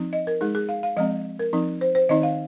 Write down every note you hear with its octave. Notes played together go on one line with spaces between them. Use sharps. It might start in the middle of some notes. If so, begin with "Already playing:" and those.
Already playing: F3 C4 D#4
D#5
A#4
G#3 D#4 G#4
G#4
F5
F5
F3 G#3 C4 D#5
A#4
F3 C4 D#4
C5
C5
D#3 C4 D#4 D#5
F5